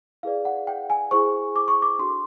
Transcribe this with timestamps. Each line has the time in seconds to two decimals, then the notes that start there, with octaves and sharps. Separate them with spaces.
0.23 E4 G#4 B4 D5 F5
0.45 F#5
0.67 G5
0.90 G#5
1.11 E4 G#4 C5 C#6
1.56 D6
1.68 C#6
1.82 D6
1.99 D4 F#4 A4 C6